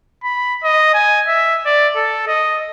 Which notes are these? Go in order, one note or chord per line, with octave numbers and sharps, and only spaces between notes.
B5
D#5
G#5
E5
D5
A4
D#5